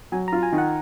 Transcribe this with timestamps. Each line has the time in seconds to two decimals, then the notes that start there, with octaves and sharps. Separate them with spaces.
0.12 F#3 G#5
0.28 A#5
0.32 F4
0.43 G#5
0.52 D#3
0.58 F#5